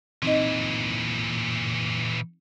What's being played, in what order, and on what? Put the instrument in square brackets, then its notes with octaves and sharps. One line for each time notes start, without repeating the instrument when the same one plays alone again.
[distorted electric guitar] A#2 E3 [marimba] C4 D#4 D#5